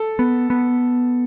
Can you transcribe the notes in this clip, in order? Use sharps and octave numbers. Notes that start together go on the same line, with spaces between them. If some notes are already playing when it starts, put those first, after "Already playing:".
Already playing: A4
B3
B3